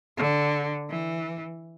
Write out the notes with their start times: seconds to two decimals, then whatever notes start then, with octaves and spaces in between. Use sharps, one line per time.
0.17 D3
0.89 E3